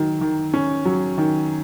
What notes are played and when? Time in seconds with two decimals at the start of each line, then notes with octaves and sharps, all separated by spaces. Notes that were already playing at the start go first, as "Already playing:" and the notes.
Already playing: D#3 F#3
0.21 D#3
0.54 C#4
0.85 F#3
1.18 D#3